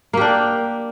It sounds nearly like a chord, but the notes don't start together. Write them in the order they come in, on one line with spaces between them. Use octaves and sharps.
A#3 G4 D4